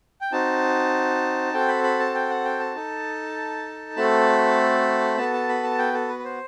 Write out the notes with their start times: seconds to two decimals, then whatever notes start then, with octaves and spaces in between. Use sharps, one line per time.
0.21 G5
0.32 C4 D#4 F#4 A5
1.53 C4 F#4 A4 G5
1.68 B5
1.84 B5
1.99 A5
2.15 G5
2.29 F#5
2.45 G5
2.60 A5
2.75 D#4 A4
3.97 A3 C4 F#4 A4 B5
5.18 B3 F#4 A4 A5
5.33 A5
5.49 B5
5.63 A5
5.78 G5
5.93 A4
6.09 B4
6.19 B4
6.24 C5